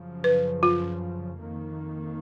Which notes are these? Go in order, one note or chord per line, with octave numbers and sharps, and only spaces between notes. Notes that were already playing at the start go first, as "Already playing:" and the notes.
Already playing: F#2 C#3 F3
B4
F4
F2 D#3 A#3